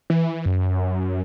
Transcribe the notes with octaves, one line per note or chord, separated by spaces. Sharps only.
E3
F#2